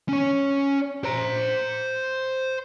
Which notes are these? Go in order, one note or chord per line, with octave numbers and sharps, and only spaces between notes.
C#4 C#5
C5 A#5